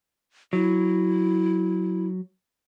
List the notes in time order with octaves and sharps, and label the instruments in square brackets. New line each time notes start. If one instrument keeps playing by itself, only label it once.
[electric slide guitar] F#3 [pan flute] E4